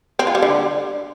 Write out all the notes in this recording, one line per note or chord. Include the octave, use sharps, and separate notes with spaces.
C4
F4
G3
D3